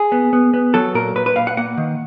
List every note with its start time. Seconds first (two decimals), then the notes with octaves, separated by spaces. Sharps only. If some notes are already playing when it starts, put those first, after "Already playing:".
Already playing: G#4
0.12 B3
0.33 B3
0.54 B3
0.74 F#3 A4
0.94 A#2 A#4
1.15 A#2 B4
1.26 B4
1.36 A#2 F5
1.47 F#5
1.57 A#3 F#5
1.77 D#3